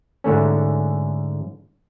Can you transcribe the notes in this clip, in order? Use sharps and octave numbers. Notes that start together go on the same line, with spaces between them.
G#2 D3 A3 C#4